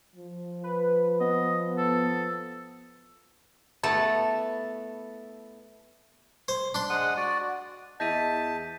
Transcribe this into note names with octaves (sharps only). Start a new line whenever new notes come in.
F3
B4
B3 D#5
A4
A3 B3 E4 A5
C5
D4 C6
G#3 F#5 D#6
F#4 D5
E2 D#5 E5 A5 G6 B6 D#7